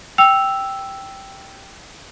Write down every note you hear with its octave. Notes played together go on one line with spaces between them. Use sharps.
G5 E6 F7